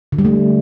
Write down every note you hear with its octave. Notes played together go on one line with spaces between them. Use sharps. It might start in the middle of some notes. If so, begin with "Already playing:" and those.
D3
G3
A3